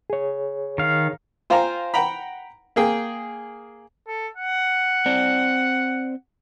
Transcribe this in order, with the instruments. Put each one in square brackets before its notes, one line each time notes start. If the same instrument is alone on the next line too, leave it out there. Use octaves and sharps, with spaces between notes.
[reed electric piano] G#4 C#5
[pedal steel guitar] D#3 F5
[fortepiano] F4 C5 F5 G5 G#5 A#5
F#5 G5 A#5 B5
A#3 G#4 G5
[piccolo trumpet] A4
F#5
[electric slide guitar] C4 C5 D5